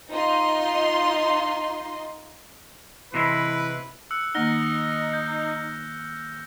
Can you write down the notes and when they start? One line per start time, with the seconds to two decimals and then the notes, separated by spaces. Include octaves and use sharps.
0.12 D#4 F4 D#5 C6
3.14 C3 E3 G#3 E4 B4
4.11 E6 F#6 C#7
4.35 D#3 A#3 D#4 F#5 F6 A#6 G7
5.13 G6